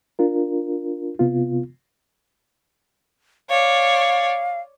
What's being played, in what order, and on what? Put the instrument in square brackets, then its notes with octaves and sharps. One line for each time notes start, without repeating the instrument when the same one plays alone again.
[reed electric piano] D4 F4 A#4
C3 B3 F4
[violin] C#5 D5 [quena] F5